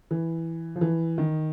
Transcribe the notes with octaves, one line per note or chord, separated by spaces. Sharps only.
E3
F3
E3
D#3